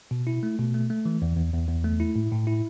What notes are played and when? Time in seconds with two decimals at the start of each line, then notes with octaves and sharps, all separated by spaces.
0.11 B2
0.27 E4
0.43 A3
0.59 B2
0.74 A3
0.90 A3
1.05 E3
1.22 E2
1.37 E2
1.53 E2
1.68 E2
1.84 A3
2.00 E4
2.16 A2
2.32 A2
2.47 E4